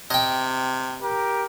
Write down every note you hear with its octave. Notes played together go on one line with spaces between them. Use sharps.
C3 D#5 G5
G4 A#4